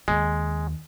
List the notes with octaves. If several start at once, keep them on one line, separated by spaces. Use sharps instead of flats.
D#2 G#3